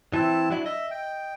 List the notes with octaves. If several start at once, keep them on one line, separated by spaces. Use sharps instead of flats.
E3 C4 E4 A5
F#3 D4 E4
D#5 E5
G5